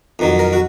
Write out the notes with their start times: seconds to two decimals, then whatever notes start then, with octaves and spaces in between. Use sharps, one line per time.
0.19 F2 D#3 F#3
0.39 A#4
0.53 F#4